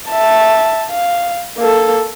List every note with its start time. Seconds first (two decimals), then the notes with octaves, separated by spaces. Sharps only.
0.10 E5 A5
0.90 F5
1.57 A#3 A4